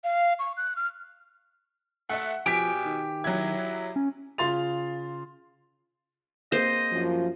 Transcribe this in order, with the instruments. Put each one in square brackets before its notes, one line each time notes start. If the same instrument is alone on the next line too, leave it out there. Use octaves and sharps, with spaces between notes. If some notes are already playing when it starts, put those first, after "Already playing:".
[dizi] F5
C#6
F#6
F6
[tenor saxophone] A3 [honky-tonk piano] E5 F#5
[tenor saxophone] B2 [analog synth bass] F3 [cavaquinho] G4 G#5 [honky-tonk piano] B6 D7
[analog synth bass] D#3
[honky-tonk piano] F#3 G#6 [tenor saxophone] E4
[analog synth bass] C#4
[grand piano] C#3 F4 C6 A6 F7
[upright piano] A#3 C4 G#4 [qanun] C5 [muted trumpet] D#5
[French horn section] F#2 F3